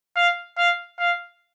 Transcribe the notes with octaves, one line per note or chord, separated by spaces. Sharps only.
F5
F5
F5